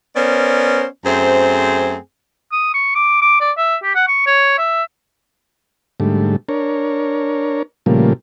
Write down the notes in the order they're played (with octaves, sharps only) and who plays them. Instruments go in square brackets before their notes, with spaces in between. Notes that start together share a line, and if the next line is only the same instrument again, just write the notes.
[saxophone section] B3 C#4 A#4 C5 D5
F#2 A3 C4 G#4 C5
[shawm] D#6
C#6
D6
D6
D5
E5
G4
F#5
C#6
C#5
E5
[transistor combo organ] G#2 D3 G3 A3
D4 A#4 C#5
A#2 C#3 F3 G3 A3 A#3